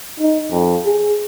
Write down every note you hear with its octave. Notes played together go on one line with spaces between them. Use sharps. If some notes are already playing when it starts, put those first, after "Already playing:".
D#4
F2
G#4